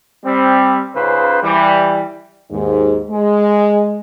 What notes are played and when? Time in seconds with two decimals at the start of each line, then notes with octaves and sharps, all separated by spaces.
0.25 G3 C4
0.96 C#2 G#2 C#3 B4 C5
1.43 E3 G3
2.51 D#2 G#2
3.10 G#3